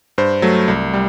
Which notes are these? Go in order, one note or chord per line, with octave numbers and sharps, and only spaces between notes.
G2 C5
F#3 A3
C2
G3